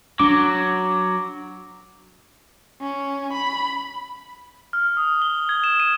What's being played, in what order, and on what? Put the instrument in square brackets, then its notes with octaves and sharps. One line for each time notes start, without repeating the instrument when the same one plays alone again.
[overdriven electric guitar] F#3 [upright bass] D4 [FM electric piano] D6
[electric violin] C#4
B5
[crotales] F6
D#6
G7
G#6
E7
D#7